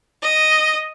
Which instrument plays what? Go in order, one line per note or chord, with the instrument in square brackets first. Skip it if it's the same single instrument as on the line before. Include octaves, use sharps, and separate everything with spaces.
[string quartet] D#5